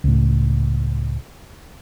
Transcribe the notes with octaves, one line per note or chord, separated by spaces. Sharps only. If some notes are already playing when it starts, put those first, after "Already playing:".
C#2 A2